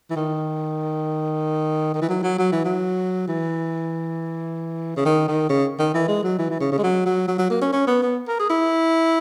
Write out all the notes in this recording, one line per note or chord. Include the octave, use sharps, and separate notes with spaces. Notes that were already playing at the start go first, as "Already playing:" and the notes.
E3
D#3
D#3
E3
F#3
F#3
F#3
E3
F#3
E3
C#3
D#3
D#3
C#3
D#3
E3
G#3
F#3
E3
E3
C#3
C#3
G#3
F#3
F#3
F#3
F#3
A#3
C#4
C#4
B3
B3
A#4
G#4
E4